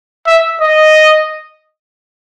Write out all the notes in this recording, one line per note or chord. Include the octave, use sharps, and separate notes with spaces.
E5
D#5